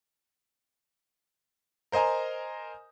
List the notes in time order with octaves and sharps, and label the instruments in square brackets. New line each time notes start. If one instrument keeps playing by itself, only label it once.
[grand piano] A#4 C5 D#5 G#5 A#5